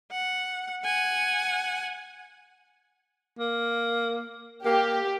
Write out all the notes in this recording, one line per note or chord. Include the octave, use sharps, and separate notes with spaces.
F#5
F#5 G#5
A#3
A#3 G4